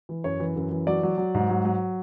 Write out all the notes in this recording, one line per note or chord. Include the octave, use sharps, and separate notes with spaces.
E3
F#2 C#5
E3
F#2
E3
F#3 D5
F#3
F#3
G#2
F#3
F#3